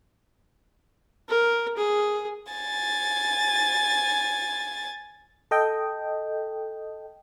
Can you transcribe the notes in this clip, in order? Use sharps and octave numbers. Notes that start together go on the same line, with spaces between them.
A#4
G#4
G#5 A6
A4 D#5 G5